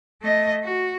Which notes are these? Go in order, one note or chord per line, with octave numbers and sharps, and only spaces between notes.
A3 D#5
F#4